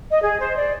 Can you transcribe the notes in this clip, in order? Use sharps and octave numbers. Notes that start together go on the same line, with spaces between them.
D#5
G#4
C5
D5